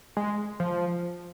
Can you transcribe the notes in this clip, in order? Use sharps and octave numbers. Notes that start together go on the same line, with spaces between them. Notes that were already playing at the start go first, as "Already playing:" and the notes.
G#3
F3